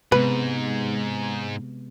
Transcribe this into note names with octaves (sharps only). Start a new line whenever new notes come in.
G#2 C3 G#3 B3 B4